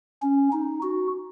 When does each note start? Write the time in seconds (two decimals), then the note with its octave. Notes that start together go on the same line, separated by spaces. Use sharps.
0.22 C#4
0.53 D#4
0.82 F#4